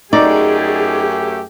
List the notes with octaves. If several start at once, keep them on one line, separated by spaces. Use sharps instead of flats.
F#2 A3 D#4 G4 G#4 D5